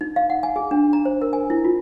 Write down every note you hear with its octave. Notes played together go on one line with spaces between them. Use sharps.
D#4
F5
F#5
G#5
G#4
D4
A#5
C5
A#4
G#5
E4
F4